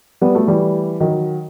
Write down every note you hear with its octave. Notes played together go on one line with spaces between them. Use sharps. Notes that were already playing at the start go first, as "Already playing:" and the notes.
G3 B3
F#3 A3
E3 G3
D#3 F#3